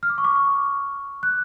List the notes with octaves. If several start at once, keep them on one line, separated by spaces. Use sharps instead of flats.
F6
D6
C#6
D6
F#6